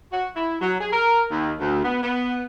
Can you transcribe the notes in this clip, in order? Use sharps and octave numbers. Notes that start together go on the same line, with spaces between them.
F#4
E4
F#3
G#4
A#4
D#2
D2
B3
B3